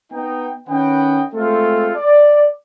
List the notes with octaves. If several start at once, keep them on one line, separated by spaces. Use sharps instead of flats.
B3 D#4 G5
D#3 C#4 B4 D#5 F#5 G5
G#3 A3 C4 F4 A4
D5